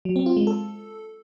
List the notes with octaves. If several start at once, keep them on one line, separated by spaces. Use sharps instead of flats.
F#3
C4
F4
G#3
A4